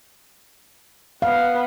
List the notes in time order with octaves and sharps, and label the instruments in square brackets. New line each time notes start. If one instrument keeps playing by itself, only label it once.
[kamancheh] B3 F#5 [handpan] F5